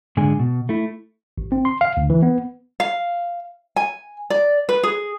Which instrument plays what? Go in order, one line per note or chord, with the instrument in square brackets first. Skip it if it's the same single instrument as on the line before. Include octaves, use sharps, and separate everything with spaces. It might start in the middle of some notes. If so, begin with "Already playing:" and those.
[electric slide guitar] G#2 D3 G#3 G#5
B2
A3 E4
[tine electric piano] G#1
C4
C6
F5
D2
E3
B3
[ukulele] F5
G#5
D5
B4
G#4